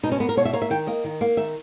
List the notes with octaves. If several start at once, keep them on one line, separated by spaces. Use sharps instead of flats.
B2 D#4
C#4
A#3 B3
A#4
B2 C#5
E5
A#3 C#5
E5
D#3 G5
A#3 D#5
D#3
A#3
D#3 E5